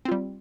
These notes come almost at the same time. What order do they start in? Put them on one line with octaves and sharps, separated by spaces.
C4 F4 G3